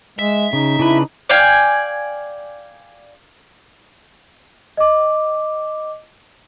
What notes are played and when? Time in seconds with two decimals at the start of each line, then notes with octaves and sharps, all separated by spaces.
0.19 G#3 E5
0.53 C#3 D#4
0.79 C#3 D4 E4 B4
1.29 D5 F5 G5 G#5
4.77 D#5 D6